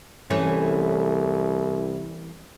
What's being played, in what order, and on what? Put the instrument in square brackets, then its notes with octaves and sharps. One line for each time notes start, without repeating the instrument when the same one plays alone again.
[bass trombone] C2 [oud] E3 A3 C#4